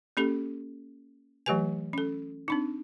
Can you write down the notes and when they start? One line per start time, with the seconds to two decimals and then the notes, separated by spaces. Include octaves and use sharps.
0.17 A#3 C#4 G4 A4
1.46 E3 F#3 A3 G4 B4 G#5
1.93 C#4 A4
2.48 C4 D4 D#4